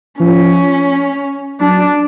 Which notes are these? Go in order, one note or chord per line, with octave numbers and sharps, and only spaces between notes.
F3 C#4
F#3 D4